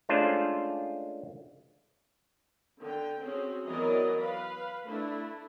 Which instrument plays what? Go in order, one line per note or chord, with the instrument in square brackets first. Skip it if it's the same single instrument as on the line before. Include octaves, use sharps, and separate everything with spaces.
[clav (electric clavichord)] G#3 A3 C#4 D4 F4 C5
[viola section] D3 G5
C4 C#4 F#4 G#4
E3 F#3 B3 A#4 D5 D#5
B4 F5 B5
A3 D4 E4